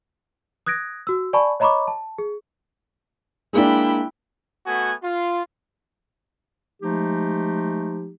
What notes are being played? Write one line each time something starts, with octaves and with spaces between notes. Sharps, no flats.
D#6 F#6 G#6 A#6 D7
F#4 E6
D5 G#5 A5 B5 C#6
C#5 D#5 A#5 B5 C#6 D6
A5
G#4
G#3 A#3 D4 E4 G5 B5
A3 B3 F#4 G#5
F4
F3 G#3 A3 D#4 G4